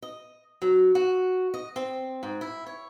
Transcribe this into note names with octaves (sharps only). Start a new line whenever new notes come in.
D#5
F#3
F#4
D#5
C4
G#2
E4
C#5